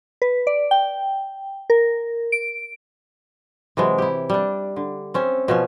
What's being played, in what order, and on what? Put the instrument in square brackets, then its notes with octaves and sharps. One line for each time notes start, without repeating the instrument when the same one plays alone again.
[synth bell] B4
D5
G5
A#4
D7
[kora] C3 E3 F#3 G#3
E4 G4
G3 D4
D3
C4 C#4 E5
B2 F3 C#4